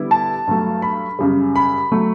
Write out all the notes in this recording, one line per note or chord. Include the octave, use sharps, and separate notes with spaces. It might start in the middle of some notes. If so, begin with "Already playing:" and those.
Already playing: D3 G3 B3 E4
A5
G2 F#3 A3
B5
F#2 C#3 G3
B5
F#3 A3